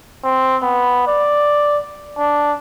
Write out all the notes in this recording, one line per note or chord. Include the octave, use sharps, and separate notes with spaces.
C4
B3
D5
D4